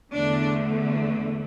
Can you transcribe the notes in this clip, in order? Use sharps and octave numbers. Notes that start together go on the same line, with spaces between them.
E2 D3 A3 D4